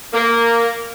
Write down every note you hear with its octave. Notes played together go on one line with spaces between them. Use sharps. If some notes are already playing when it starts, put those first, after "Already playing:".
A#3